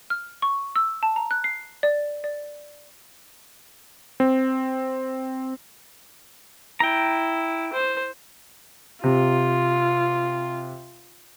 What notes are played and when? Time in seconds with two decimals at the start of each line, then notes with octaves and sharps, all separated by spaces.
0.10 F6
0.42 C#6
0.76 E6
1.03 A5
1.16 A#5
1.31 F#6
1.44 C7
1.83 D5
2.24 D5
4.20 C4
6.80 E4 G5 A#5
7.74 C5
9.04 C3 F4